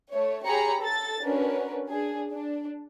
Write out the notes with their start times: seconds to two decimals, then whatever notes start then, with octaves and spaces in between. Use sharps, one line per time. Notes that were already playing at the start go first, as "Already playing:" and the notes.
0.11 A3 C#5
0.45 G4 G#4 C#5 A#5 B5 C#7
0.81 A4 A6
1.22 C#4 D4 F#4 A#4 B4
1.87 D4 G#4
2.32 D4